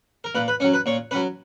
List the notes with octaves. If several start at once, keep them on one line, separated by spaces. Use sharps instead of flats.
A#4
A#2 B4
B4
F#3 C#4 C#5
B4
A#2 C#5
F#3 C#4 B4